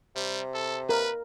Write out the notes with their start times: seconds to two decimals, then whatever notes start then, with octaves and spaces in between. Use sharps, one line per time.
0.16 C3 G3
0.54 A4
0.89 A#4 B4